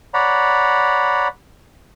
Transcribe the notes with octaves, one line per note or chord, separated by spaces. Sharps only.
C#5 D5 F#5 A#5 B5